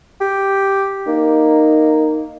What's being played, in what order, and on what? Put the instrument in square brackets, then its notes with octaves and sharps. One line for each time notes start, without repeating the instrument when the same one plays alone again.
[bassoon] G4
[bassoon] A#3 [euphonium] D#4